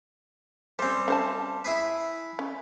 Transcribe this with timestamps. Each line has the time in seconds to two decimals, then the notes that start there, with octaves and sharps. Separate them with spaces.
0.79 G3 C4 C#4 C5
1.08 C#4 C5 A5
1.64 E4 G#4 B4
2.39 C#4